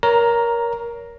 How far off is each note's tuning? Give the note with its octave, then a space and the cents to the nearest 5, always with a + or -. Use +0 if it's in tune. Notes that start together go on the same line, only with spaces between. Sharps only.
A#4 +15 C#5 +25 A#5 +0